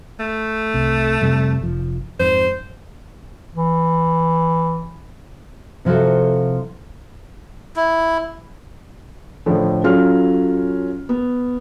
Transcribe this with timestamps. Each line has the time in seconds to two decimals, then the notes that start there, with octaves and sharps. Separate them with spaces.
0.20 A3
0.74 C2 C3
1.22 F2 C3 G3
1.61 F1 F3
2.20 F2 G#2 C5
3.55 E3
5.85 C3 F3 E4 F#4 A4
7.76 E4
9.46 A2 D3 F3
9.84 F#3 C#4 F4 A4 F6
11.09 B3